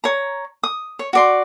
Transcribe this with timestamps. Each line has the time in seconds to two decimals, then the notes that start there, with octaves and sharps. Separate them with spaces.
0.04 C#5 A#5
0.63 D#6
0.99 C#5
1.13 F#4 D5 C6